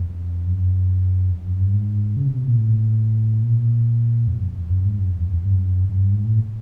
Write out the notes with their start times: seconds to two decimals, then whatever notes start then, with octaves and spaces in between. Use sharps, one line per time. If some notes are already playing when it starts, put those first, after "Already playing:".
Already playing: F2
0.46 F#2
1.31 F2
1.46 F#2
1.60 G2
1.73 G#2
2.17 C#3
2.27 C3
2.37 B2
2.48 A#2
2.58 A2
3.43 A#2
4.28 F2
4.43 F2
4.70 F#2
4.85 G#2
4.99 F#2
5.12 F2
5.18 E2
5.23 F2
5.33 F2
5.45 G2
5.54 F#2
5.89 F#2
5.97 G2
6.12 G#2
6.25 A2